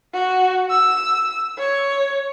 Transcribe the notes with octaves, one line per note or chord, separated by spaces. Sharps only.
F#4
E6
C#5